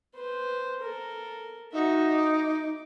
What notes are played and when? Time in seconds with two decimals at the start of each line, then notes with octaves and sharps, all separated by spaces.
0.15 B4 C5
0.81 A4 A#4
1.73 D#4 F#4 E5
2.13 D6